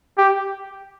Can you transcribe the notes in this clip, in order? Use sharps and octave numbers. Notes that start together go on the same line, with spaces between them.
G4